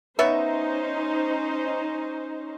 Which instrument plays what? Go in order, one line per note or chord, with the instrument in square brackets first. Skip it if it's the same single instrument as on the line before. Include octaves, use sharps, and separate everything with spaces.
[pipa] B3 C#5 E5 [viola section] C#4 D#4 C5